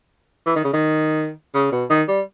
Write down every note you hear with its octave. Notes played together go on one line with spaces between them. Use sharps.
E3
D#3
C#3
D#3
C#3
B2
D#3
G3